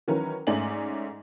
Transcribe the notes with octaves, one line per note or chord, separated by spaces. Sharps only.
D#3 E3 F#3 C#4 A#4 B4
G#2 A3 C#4 D5 G#5 F#7